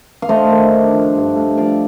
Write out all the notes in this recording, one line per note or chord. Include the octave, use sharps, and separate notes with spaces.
F5
A3 C5 D#5
D#3
D4
F3
G2
A3
F3 D5 F5